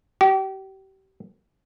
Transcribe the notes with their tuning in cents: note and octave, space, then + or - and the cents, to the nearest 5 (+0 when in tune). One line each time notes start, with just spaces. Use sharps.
G4 -35